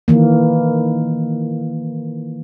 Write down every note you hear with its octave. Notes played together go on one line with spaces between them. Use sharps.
D#3 E3 A#3